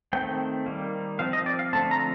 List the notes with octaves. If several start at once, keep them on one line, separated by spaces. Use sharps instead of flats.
D#3 A3 C4 G5
D#3 G3 A#3
F3 C4 F5
D#5
D5
F5
D3 F3 A3 C4 A5
A#5